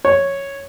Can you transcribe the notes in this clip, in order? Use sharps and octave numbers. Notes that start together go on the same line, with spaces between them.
C#5